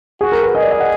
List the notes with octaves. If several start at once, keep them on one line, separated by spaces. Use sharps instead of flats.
F#4 G#4
A#4
B4
G#4 D#5
D5
D#5
F#5